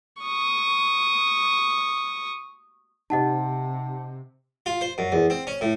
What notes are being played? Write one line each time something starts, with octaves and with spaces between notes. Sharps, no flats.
C#6 D#6
C3 D#4 G4 C5 D#5 F#5 A5
F4
C5
F#2
E2
C4
C#4
A2